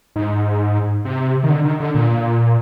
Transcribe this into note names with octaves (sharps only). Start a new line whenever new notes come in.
G#2
C3
D#3
D3
D#3
D3
A#2